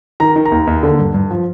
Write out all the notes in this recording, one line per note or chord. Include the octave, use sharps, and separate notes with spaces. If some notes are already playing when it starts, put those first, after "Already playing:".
D#3 A#5
D#3
A#5
D#2
D#2
D3
G2
G2
F3